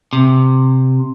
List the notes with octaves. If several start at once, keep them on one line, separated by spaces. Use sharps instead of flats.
C3